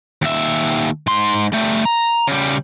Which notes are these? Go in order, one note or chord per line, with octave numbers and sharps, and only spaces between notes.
D#2 E5
G#2 C6
G3 A3
A#5
C#3 G3